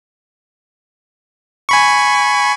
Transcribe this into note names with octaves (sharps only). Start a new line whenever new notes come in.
G#5 B5 C#6